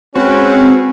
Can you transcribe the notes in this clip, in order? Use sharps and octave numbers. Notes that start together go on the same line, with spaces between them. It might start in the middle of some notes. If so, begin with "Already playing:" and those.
G#3 C4 C#4 F#4 B4